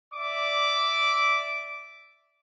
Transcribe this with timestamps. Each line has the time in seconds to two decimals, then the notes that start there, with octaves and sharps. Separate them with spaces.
0.14 D5 E5 D6